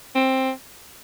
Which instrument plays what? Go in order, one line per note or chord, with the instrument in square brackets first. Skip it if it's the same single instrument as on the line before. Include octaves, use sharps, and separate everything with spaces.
[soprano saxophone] C4